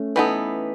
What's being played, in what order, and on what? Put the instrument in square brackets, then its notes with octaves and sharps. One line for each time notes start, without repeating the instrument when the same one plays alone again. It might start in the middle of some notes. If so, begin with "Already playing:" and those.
Already playing: [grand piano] A3 C#4
[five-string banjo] E3 B3 D#4 A4